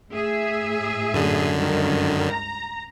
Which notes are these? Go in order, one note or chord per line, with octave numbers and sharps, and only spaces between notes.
A2 G#4 E5
F#2 D3
C#2 G2 D#3
A#5